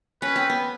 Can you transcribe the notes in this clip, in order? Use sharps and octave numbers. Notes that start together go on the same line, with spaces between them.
C#4 B4
C4
B3